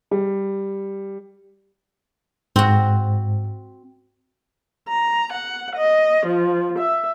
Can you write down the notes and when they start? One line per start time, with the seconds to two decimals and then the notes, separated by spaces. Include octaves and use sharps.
0.11 G3
2.56 G#2 C4 F#4
4.88 A#5
5.32 F#5
5.75 D#5
6.26 F3
6.78 E5